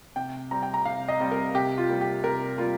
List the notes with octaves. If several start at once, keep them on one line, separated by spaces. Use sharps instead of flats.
C3 G5
G3 C4 A#5
G5
A#5
C3 F5
D#5
G3 C4
A#4
C3 G4
F4
G3 A#3
G4
C3 A#4
G3 A#3 F4